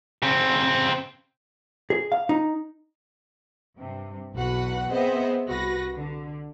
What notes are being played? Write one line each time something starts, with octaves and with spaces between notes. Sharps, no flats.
C#3 C4
G#4
F5
D#4
G2 C3
B1 E2 F#4 B4 F#5
B3 C4 G#4 C5 D#5 E5
C2 F#4 B4 A#6
D3